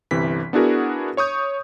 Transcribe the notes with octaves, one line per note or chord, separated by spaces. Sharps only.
G1 C3 E3 B6
B3 D4 E4 F#4 G#4 A#4
C#5 C#6 D#6 G6